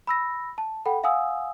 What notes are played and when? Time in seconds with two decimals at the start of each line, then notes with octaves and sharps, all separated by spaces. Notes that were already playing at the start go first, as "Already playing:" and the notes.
0.07 B5 E6 A#6
0.58 A5
0.86 A4 F#5 G5 B5
1.04 F5 F#5 G#5 D#6 E6